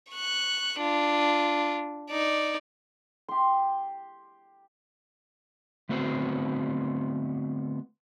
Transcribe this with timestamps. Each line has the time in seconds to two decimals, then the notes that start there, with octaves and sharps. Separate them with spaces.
0.11 C#6 F#6
0.79 D4 F4
2.11 D#4 D5
3.28 G4 C6
5.89 D3 A3 B3 C4 F#4 C5